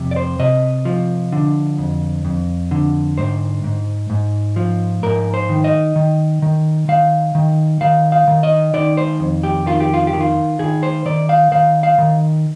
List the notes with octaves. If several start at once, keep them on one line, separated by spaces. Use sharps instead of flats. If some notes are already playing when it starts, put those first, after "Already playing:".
Already playing: F2 C3
D5
C5
C3 D#5
F3
D3
F2
F2
D3
G#2 C5
G#2
G#2
F3
G#2 A#4
C5
D#3
D#5
D#3
D#3
D#3 F5
D#3
D#3 F5
F5
D#3
D#5
D#3 D5
C5
F2
G4
D#3 F4
G4
F4
G4
D#3
F4
D#3 G#4
C5
D#3 D5
F5
D#3 F5
F5
D#3